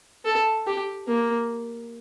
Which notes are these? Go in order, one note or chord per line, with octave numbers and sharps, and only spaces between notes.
A4
G4
A#3